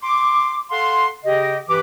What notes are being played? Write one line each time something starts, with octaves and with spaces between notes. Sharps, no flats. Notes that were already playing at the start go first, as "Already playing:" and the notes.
C6 D6
A4 F5 F#5 C6
C#3 G4 D#5
G2 E3 G4 B4 D6